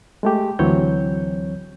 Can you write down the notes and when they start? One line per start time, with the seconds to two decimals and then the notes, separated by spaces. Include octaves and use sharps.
0.23 G#3 A3 G4
0.59 D2 E3 F#3 C4 C#5 G6